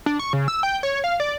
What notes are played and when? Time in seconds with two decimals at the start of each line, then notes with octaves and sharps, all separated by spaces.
0.06 D4
0.19 C#6
0.33 C#3
0.48 E6
0.63 G5
0.83 C#5
1.04 F5
1.20 D5